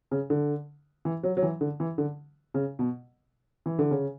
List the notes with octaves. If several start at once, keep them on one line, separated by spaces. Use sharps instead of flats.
C#3
D3
E3
F#3
F#3
E3
D3
E3
D3
C#3
B2
E3
D3
C#3